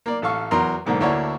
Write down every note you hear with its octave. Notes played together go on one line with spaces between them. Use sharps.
A#3 D5
A1 A4 F5 C#6
E2 F#3 A#4 A#5 C6
B1 G#2 D3 A#3
D2 D3 A#3 E4 C#5